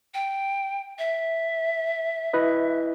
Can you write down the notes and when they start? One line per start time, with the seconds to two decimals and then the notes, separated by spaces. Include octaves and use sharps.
0.14 G5
0.99 E5
2.33 E4 B4 D#5